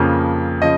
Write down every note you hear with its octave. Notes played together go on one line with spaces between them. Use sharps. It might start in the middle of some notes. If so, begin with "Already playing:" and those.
Already playing: F2 C#3 F3 A#3
C#3 F3 D#5